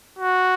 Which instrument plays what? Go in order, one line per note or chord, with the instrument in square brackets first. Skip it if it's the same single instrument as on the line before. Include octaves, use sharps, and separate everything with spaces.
[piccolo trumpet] F#4